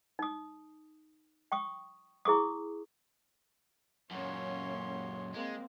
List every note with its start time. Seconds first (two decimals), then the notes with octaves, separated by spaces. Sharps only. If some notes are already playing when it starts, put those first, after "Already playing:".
0.19 D#4 D#6
1.52 G5 C#6 D#6
2.25 E4 G#4 C#6 D#6
4.11 F#2 A#2 A#3 C#4 C#5 C6
5.35 G#3 A#3 C4